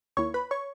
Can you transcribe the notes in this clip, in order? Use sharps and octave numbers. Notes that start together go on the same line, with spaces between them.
D#2 D#3 A#3 E4 C#5 C#6
B4 B5
C#5 C#6